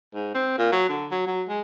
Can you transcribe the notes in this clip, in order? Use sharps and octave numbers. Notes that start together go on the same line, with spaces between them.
G#2
C4
A#2
F#3
D3
F#3
F#3
G#3